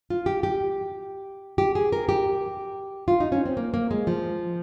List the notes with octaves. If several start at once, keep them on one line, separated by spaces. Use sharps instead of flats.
F4
G4
G4
G4
G#4
A#4
G4
F4
D#4
C#4
C4
A#3
A#3
G#3
F3